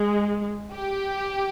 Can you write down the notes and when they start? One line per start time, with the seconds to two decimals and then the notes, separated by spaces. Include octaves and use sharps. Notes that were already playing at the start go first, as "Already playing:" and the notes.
Already playing: G#3
0.74 G4